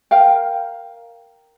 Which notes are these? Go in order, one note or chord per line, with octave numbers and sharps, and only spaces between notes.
A#4 F5 G5